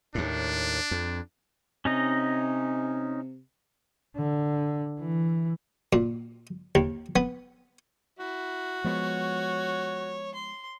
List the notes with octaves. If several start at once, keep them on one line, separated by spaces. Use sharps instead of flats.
D#2 A2 D4
F2
C3 C#4 D#4 D#5
D3
E3
A#2
D#2
B3
E4 F#4
F3 G#3 B3 C#5
C6